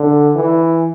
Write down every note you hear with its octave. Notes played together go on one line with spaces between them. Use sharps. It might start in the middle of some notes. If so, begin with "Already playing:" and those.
Already playing: D3
E3